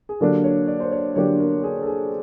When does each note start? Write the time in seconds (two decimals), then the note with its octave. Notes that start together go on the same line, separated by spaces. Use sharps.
0.09 G#4
0.20 D3 F#3 A#3 D4 G4 A4
0.44 C#5
0.68 D5
0.80 C5
0.92 C#5
1.16 D3 F#3 A#3 D4 G4 C#5
1.40 A#4
1.64 G#4
1.82 A4
1.86 G#4